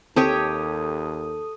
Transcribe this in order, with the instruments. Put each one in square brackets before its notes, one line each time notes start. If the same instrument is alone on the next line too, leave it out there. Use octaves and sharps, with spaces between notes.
[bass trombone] D#2 [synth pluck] C4 [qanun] G4 C#5 G5 [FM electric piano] A4 D#6